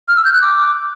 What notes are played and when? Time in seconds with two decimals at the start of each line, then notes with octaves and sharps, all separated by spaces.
0.08 F6
0.17 E6
0.25 G6
0.33 F#6
0.42 D6